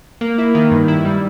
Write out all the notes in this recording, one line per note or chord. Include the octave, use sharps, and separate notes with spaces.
A#3
E4
D#3
G2
E4
G3